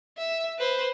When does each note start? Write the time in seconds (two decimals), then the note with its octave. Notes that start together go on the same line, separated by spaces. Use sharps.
0.18 E5
0.58 B4 C5